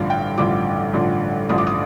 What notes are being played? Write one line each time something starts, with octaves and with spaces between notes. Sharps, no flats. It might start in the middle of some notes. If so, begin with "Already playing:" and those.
Already playing: A1 G2 D3 F3 F5
G5
A1 G2 D3 F3 D6
A1 G2 D3 F3
A1 G2 D3 F3 D#6
D6
D#6